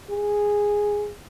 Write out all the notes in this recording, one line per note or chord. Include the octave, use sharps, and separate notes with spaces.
G#4